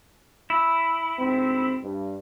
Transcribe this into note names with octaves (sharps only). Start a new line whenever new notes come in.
E4
D2 G#2 C4
G2